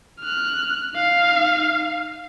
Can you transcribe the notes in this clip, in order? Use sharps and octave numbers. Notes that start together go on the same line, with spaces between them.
F6 F#6
D#4 F5